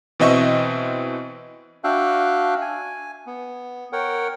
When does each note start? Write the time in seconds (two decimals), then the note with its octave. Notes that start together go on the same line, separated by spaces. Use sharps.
0.20 B2 E3 C4 D#5 E5 C#6
1.84 D4 F#4 E5 F5 G5 F#6
2.61 G#5
3.27 B3
3.92 A#4 C#5 F#5 G5